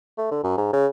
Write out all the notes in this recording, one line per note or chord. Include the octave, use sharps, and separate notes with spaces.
A3
D3
F#2
G#2
C#3